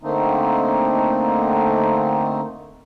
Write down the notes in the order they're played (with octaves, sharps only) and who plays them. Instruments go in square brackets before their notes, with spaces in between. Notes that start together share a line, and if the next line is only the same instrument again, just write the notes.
[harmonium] D3 A3 A#3 C4 D#4